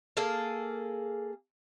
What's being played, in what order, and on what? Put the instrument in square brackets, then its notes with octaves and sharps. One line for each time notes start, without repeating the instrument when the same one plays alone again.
[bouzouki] A#3 G#4 A4